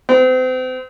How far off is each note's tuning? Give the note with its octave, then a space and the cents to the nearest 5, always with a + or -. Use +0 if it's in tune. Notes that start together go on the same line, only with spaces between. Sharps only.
C4 -35